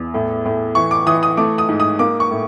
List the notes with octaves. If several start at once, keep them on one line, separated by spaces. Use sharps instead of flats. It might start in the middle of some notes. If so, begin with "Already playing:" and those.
Already playing: E2
A2
A2
E3 C#6
D6
E3 D#6
D#6
A3 D6
D#6
G#2
D#6
A#3 D6
C#6
A2